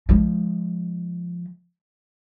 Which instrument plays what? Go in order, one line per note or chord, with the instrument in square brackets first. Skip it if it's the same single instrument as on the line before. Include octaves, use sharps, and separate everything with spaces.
[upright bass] F3 G#3